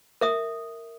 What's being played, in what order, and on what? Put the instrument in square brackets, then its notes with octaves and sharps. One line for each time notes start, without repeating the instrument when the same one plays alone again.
[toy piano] A#4 E5 D#6